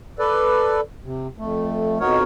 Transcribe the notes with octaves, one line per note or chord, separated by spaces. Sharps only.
A4 B4 D5
C3
F2 A3
F2 B2 D#4 F#4 A#4 C#5